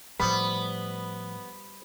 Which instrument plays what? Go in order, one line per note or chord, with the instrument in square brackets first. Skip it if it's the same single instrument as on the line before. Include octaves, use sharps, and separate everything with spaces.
[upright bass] A2 F3 [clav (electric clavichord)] G3 C5 [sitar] B3 [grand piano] B5